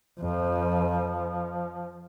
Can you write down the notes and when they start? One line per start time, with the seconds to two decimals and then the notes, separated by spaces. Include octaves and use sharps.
0.19 F2 F3